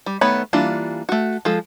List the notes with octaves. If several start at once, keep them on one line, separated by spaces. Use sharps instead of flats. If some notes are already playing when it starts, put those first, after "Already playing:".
G3
D#3 A3 B3 C#5 B5
E3 G3 A#3 D4 F4
A3 F#4
F3 G#3 A4